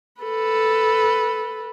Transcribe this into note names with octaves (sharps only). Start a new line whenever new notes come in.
A4 B4